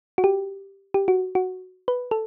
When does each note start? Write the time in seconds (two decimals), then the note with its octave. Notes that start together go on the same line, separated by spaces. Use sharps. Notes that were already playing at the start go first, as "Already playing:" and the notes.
0.18 F#4
0.24 G4
0.94 G4
1.08 F#4
1.35 F#4
1.88 B4
2.11 A4